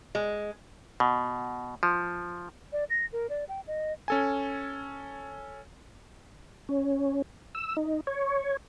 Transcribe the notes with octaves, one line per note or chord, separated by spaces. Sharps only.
G#3
B2
F3
D5
A#6
A#4
D5
G5
D#5
C#4 A4 G#5
C#4
E6
D#4
C#5